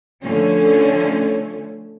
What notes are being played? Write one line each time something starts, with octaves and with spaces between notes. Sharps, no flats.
D3 F3 A3 C#4